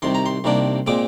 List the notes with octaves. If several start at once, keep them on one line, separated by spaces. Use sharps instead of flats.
C2 C3 D#3 C6
A#5
C6
C2 C3 D#3 A#3 D4
A#2 G#3 C4 D6